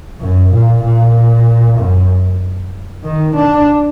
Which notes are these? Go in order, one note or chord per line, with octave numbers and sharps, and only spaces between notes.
F#2
A#2
A#2
F#2
D#3
D4